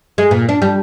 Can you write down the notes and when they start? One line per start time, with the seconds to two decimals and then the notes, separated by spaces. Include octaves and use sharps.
0.18 G#3
0.31 A#2
0.49 D4
0.62 G3